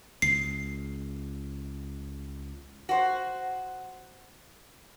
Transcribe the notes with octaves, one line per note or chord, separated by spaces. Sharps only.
C#2 C7
F#4 C5